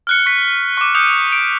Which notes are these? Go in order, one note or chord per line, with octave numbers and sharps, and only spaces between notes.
F6 F#6 C#7
C#6 B6
C#6 D6
D#6 G6 C#7
D7